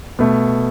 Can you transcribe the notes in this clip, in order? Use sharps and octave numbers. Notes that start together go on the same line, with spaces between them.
B2 A3